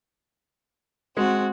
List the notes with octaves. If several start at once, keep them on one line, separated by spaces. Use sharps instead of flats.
G#3 C4 F#4